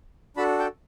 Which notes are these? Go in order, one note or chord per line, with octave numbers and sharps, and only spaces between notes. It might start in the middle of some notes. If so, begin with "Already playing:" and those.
D4 F#4 A4 A5 B5
G5 A5